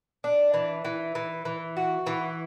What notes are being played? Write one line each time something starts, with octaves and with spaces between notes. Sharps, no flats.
D4
E3
E3
E3
E3
F#4
E3